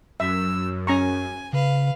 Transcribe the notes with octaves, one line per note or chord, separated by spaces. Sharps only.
F#2 E5 E6
C#4 G#5 A#5 C#6
C#3 B4 F5